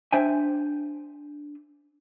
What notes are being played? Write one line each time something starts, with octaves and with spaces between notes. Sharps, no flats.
D4 C5 E5 G5 G#5